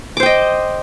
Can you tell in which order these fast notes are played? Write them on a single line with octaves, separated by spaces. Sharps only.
D6 C5 G5 D#5